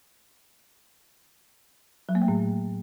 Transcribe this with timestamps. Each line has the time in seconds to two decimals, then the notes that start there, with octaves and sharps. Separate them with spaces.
2.09 F#3
2.15 A#3
2.22 A3
2.28 A2